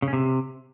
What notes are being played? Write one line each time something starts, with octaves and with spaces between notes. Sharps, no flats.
C#3
C#4
C3